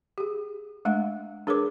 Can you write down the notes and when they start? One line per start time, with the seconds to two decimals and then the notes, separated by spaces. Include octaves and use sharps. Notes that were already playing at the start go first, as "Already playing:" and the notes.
0.18 G4 G#4
0.85 G#3 A3 D4 F#5
1.47 D4 G#4 A#4 B4 C#5 D6